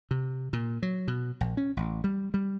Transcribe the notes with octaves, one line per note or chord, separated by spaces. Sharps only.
C3
A#2
F#3
B2
A#1
C#4
A1
G3
G3